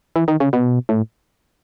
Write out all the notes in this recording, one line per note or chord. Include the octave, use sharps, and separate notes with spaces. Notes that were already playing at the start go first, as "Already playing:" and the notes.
E3
D#3
C#3
B2
A2